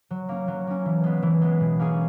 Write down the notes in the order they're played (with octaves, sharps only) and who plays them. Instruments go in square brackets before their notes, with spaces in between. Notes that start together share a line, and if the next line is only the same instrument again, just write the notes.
[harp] F#3
A#3 C#4
F#3
A#3 C#4
E3
G#3 B3
E3
G#3 B3
B2
A#3 C#4 G#4